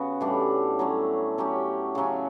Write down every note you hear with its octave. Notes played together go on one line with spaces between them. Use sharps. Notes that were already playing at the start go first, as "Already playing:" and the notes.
Already playing: C#3 B3 F#4
A2 E3 G3 D4
F#3 A3 C#4
F#3 C#4 G4
C#3 F#3 C#4